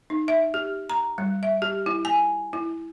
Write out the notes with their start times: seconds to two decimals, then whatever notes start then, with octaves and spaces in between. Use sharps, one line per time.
0.10 D#4
0.28 E5
0.54 G4
0.90 A#5
1.18 G3
1.43 E5
1.62 G4
1.86 E4
2.05 G#5
2.53 E4